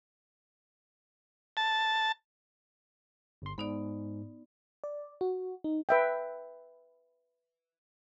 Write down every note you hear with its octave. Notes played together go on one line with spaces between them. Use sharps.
A5
G1 C6
G#2 B3 D#4 D5
D5
F#4
D#4
B4 E5 G5